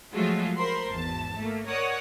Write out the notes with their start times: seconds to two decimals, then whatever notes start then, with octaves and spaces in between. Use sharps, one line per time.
0.13 F3 F#3 G#3 A3 F4 F#4
0.57 A#4 C5 B5 C6
0.90 G#1 E2 A5
1.38 A3 A#3
1.68 A#4 C#5 D5 F#5 D#6